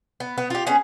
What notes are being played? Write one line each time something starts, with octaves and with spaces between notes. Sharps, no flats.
B3
B3
F4 G4
B3 C#4 G#4